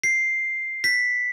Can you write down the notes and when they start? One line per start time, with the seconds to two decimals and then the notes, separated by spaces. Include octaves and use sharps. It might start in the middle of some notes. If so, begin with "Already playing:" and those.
0.04 C7
0.84 B6